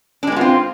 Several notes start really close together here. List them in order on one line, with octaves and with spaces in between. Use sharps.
D4 G#3 B3 F4 C4